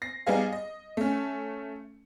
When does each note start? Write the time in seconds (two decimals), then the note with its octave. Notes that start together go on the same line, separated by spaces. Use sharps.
0.02 A#6 C7
0.26 G3 B3 D#4 G#4 F5
0.52 D#5
0.97 A3 C#4